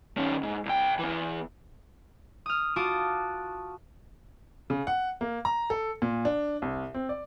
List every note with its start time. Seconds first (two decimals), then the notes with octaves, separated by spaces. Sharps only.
0.17 D#3 C#4
0.43 G#2
0.66 C2 G5
0.99 E2 E3
2.46 D#6 F6
2.76 F4 F#4 A5 D6 D#6
4.70 C#3
4.87 F#5
5.21 A#3
5.45 A#5
5.70 A4
6.02 A#2
6.25 D4
6.62 C2
6.94 C4
7.09 D5